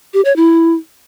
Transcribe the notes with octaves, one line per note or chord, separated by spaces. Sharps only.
G4
C#5
E4